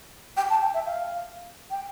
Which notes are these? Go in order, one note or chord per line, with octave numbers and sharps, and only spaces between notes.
G5
A5
G5
E5
F5
G5